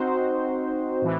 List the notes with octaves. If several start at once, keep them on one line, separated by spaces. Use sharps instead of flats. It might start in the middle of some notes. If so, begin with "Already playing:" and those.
Already playing: C4 D#4 F#4 C5
A2 E3